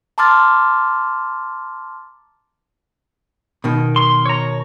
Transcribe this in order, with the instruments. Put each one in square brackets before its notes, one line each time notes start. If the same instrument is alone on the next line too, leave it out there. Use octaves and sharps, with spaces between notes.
[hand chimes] A5 A#5 C6 D6 F6 A6
[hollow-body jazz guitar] B2 D#3
[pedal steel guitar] C6
C#5 A#5